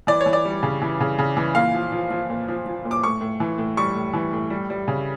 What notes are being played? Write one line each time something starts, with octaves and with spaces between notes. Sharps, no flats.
E3 D5
C#5
E3
D5
G3
C#3
E3
C#3
C#3
E3
A#2 F5
F3
F3
F3
A#2
F3
F3
A#2
D6
A2 C#6
A2
E3
A2
G3 C#6
A2
E3
A2
G3
G3
C#3